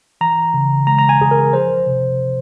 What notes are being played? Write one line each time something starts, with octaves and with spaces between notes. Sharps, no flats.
E3 A#5
C#3
G#3 A#5
A#5
G#5
F2 G#4
A#4
F3 C5
C3